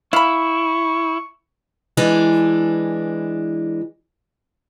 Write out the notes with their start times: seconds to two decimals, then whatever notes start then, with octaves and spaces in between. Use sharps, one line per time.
0.13 E4 F5 B5 C#6
1.97 E3 G#3 D4